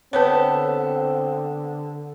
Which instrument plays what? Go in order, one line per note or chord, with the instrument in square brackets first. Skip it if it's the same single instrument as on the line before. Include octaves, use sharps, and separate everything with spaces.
[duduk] D3 [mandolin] B3 G4 A4 [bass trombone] C4 [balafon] B4 C#5